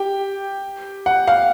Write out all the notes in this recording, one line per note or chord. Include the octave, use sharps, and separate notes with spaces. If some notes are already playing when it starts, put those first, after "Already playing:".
Already playing: G4 G5
F#5
F5